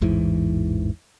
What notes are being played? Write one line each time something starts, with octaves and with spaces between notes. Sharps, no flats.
A1 E2 G#2 E3